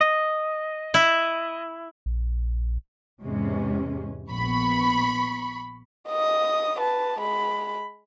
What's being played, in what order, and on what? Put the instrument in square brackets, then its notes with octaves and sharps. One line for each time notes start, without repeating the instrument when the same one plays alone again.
[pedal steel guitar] D#5
[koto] E4
[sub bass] A#1
[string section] E2 G#2 C3 [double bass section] G#3 C#4
[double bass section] A#1 B3 [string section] B5 C#6
[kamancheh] D#5 D#6
B4 A5
G#3 B5